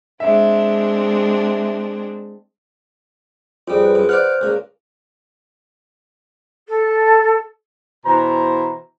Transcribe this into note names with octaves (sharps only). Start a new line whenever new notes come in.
G#3 C4 D4 E5
F2 G3 F4 G#4
B4
F#2
C5 D5 F5 F#5 F6 F#6
C#2 A#2
A4
B2 E3 C5 A#5